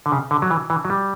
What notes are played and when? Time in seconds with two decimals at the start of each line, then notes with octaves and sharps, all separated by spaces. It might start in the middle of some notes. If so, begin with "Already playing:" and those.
0.06 D3
0.12 C#3
0.31 D3
0.42 F#3
0.51 E3
0.70 E3
0.85 F#3
0.90 G3